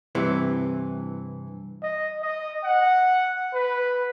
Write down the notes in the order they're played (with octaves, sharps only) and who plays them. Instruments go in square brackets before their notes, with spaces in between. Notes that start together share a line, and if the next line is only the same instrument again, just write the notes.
[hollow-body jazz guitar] G2 C3 E3
[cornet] D#5
D#5
F#5
B4